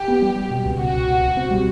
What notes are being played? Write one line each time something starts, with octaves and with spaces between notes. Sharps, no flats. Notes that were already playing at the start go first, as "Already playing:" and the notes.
Already playing: G4
B3
G3
G3
B2
C#2
B2 F#4
B2
B2
C#2
C4
G3